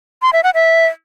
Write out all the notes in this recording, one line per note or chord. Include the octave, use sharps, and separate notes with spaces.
C6
E5
F#5
E5